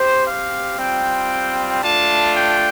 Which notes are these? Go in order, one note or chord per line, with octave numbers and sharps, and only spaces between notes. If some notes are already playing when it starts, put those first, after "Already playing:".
Already playing: C4 G4 C5
F5
G3 C4 F4 G5
A3 D4 F4 A5
G5